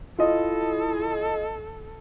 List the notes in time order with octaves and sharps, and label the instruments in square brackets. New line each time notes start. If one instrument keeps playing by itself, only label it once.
[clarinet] E4 [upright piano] F4 D#5 [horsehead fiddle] A4